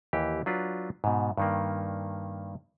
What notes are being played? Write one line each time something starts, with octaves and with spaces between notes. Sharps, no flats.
D#2 E3 G4
F#3 D4 F4 B4
G#2 B2
G2 D#3 A#3